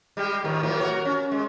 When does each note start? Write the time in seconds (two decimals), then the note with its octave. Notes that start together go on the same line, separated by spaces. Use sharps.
0.17 G3 G#3 G4
0.44 A2 D#3 F3
0.63 A2 E3 F#3
0.80 F#4 A#4 C#5
1.05 C#4
1.32 G#3